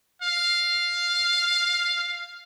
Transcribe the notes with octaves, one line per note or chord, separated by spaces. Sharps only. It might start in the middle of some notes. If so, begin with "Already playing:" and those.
F5